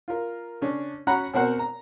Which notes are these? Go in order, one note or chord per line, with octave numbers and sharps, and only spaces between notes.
F4 A#4
C#3 C#4 D4
C#4 F#4 F#5 A#5 B5
B2 C4 F#4 A#4 C5 F#5
A#5